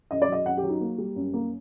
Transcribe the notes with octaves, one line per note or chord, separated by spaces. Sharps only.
F#2 D#5
D5
F#3 D#5
F#2 F#5
G4
F#3
D#4
A#3
G3
F#2
A#3